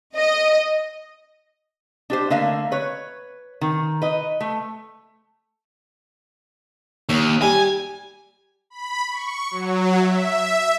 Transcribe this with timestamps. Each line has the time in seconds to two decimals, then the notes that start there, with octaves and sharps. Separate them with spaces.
0.16 D#5
2.10 D4 G4 C5
2.30 D3 A3 A#3 E5 F5
2.72 B4 C#5
3.61 D#3
4.02 B4 D#5
4.41 A3
7.09 D#2 C#5
7.42 G3 G#5
8.70 B5
9.10 C#6
9.51 F#3
9.99 E5